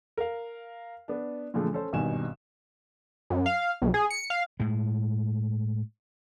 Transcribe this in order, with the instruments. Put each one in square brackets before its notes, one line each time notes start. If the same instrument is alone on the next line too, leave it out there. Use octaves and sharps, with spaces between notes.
[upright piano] A#4 F5
B3 D4
A#2 D3 E3 F3 G#3 A3
C#4 A4 C5
G#1 G2 B2 D#3 G#5 E7
[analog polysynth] F#2
F5
B1
G#4
C#7
F5
[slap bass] A2 G#3